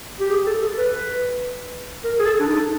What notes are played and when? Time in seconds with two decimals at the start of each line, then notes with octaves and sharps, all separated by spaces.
0.20 G4
0.30 G#4
0.46 A4
0.62 A4
0.78 B4
2.04 A#4
2.19 G#4
2.25 A4
2.40 D4
2.46 D#4